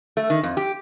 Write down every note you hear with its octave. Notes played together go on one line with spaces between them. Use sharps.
A3
D#3
F2
G4